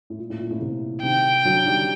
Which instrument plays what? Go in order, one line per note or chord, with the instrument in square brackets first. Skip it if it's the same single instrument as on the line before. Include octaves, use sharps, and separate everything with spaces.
[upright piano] A2
A#2
A2
A#2
A2
A2 C3
[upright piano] C3 D#3 [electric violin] G5
[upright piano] D3 F#3
D#3 G3